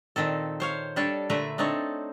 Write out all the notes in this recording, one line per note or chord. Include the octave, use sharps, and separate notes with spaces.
A#2 D#3 C4 A4
C5 C#5 F5
G3 D4 A4 C#5
A#2 D3 A3 B4 E5 A#5
C4 D4 D#4 A4 C#5